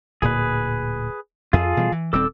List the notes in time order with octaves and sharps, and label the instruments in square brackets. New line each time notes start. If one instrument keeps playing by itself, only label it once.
[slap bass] D1 A#2 [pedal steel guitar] G#4 B4
[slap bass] F2 [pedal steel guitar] F4 G#4 A4
[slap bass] B2 E3 G3
E3
[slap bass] D#1 G3 C4 [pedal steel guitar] A4 D6 E6